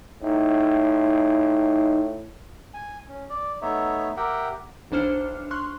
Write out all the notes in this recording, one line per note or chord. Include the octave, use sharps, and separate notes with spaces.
A2 D#4
G#5
C#4
D5
A3 B3 D#4 C#5 E5
G4 A#4 E5 F#5 G5
B1 E3 D4 C5 F6 C#7
C6 C#6 F6 F#6